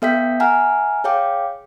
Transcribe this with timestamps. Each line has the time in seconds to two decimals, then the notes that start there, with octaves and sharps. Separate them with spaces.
0.02 B3 A4 E5 G5 G6 B6
0.40 E5 F#5 G#5 A#5 F6
1.04 G#4 C#5 F5 G5 D6